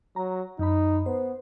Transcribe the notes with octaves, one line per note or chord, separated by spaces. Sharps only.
F#3 A#5
F#2 D#4 B5
B3 C5